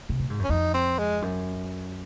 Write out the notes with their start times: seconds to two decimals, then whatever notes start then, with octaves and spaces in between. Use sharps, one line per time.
0.09 C3
0.20 A#2
0.30 G#2
0.39 F#2
0.44 C#4
0.49 F2 D#4
0.74 C4
0.99 G#3
1.22 F#2